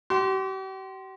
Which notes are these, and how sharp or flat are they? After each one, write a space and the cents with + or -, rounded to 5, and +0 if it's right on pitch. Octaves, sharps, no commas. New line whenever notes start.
G4 -45 C6 +0